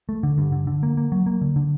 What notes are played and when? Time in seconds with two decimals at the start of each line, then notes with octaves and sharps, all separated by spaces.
0.09 A3
0.23 D3
0.38 G2
0.52 D3
0.67 D3
0.83 A#3
0.97 A#3
1.12 F#3
1.26 A#3
1.41 D3
1.56 D3